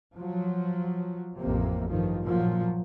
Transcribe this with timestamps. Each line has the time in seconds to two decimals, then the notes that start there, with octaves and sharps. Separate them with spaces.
0.15 F3 F#3
1.38 A1 F2 C3 A#3
1.88 G2 D#3 F3
2.25 A#2 F3 F#3